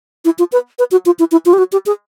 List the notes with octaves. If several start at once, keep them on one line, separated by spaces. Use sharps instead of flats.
E4
F4
B4
B4
F#4
F4
E4
E4
F4
G4
F#4
G4
G#4